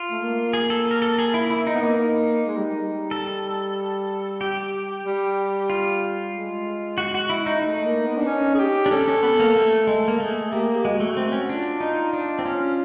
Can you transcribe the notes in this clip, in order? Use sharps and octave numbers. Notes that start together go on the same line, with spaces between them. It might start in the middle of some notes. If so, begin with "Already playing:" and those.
Already playing: F4
A3
A#3
G#4
A4
A#4
A4
G#4
E4
E4
D#4
B3
A#3 D#4
G#3
G3
G3
A4
G4
G3
F4
G#3
F#4
F#4
E4
D#4
A3 D#4
A#3
B3
D4
C#4
G#4
G4
D4
C#4 A4
C#4
B3
A#3
A3
G#3
A#3
A3 G#4
A#3 G4
G#4
G4
G#3 F#4
A3
C4
C#4
D4 F4
D#4
D4
C4
C#4